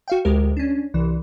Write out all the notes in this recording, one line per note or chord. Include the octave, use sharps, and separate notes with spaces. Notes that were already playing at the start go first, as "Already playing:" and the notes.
F#4 F5 G5
D2 G#3 G4 A#4
C#4 D4
C2 E3